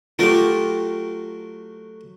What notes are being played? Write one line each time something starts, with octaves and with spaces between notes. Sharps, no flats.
F#3 A3 F4 G4 A#4